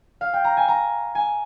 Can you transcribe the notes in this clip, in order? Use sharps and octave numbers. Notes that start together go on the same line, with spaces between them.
F5
G5
A#5
G#5
A#5
G#5